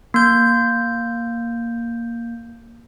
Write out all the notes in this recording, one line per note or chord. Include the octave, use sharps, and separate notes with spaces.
A#3 G6